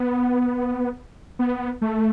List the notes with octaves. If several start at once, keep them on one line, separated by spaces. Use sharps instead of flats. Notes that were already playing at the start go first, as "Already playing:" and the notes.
Already playing: B3
B3
A3